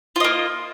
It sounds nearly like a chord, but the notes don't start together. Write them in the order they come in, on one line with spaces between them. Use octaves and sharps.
F4 D#5 A#3